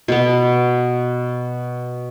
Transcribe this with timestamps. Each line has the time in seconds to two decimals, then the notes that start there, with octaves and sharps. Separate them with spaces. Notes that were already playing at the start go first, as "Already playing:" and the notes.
0.08 B2 B3